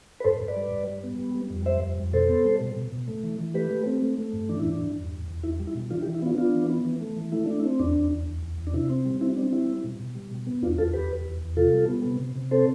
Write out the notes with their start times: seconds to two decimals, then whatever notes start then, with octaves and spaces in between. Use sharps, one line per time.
0.20 B4
0.24 G2 A4 C5
0.40 G2
0.48 B4 D5
0.56 G3
0.72 G2
0.87 G3
1.03 B3
1.19 G3
1.35 G3
1.50 F2
1.66 G3 C5 E5
1.82 F2
1.98 F2
2.13 B2 A4 C5
2.29 B3
2.45 G3
2.60 B2
2.76 B2
2.92 B2
3.08 A3
3.23 E3
3.39 E3
3.54 A3 G4 B4
3.71 A3
3.86 C4
4.02 A3
4.18 A3
4.33 G2
4.49 E3 D4
4.59 E4
4.65 G2 D4
4.81 G2
4.97 E2
5.12 E2
5.28 E2
5.43 E2 E4
5.60 G3
5.67 E4
5.75 B2
5.90 E3 D4 F4
6.02 E4 G4
6.06 E3
6.14 E4
6.22 B3 D4 F4
6.38 B3 D4 F4
6.54 E3
6.69 B3
6.85 E3
7.01 A3
7.17 E3
7.32 A3 E4
7.46 A3 D4
7.60 E4
7.64 C4
7.79 E2 D4
7.96 E2
8.11 E2
8.27 E2
8.42 E2
8.58 E2
8.67 D4
8.73 C3 E4
8.90 C4
9.05 G3
9.21 C4 E4
9.37 C4 D4
9.53 G3 E4
9.68 G3
9.84 B2
9.99 B2
10.15 G3
10.31 B2
10.47 B3
10.62 E2 D4 F4
10.78 E2 F4 A4
10.93 E2 G4 B4
11.10 E2
11.25 E2
11.41 E2
11.57 C3 F4 A4
11.73 G3
11.88 B3
12.04 C3
12.20 C3
12.35 C3
12.51 C4 A4 C5